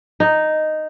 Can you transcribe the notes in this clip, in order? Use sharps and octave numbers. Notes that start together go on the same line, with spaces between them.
D#4